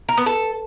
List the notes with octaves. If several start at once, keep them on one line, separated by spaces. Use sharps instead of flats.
A#4
B3
A4